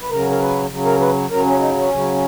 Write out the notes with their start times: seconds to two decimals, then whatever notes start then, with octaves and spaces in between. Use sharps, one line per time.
0.02 B4
0.10 C#3 F#3 A#4
0.30 A#4
0.40 B4
0.70 C#3 F#3
0.85 A#4
1.00 B4
1.30 C#3 F#3 A#4
1.45 C#4
1.59 D#4
1.75 C#4
1.90 C#3 F#3